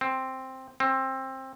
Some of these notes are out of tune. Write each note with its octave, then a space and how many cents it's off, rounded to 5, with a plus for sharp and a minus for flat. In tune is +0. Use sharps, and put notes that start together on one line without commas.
C4 +5
C4 +20